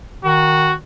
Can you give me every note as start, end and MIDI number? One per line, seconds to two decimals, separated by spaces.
0.25 0.78 51
0.25 0.75 66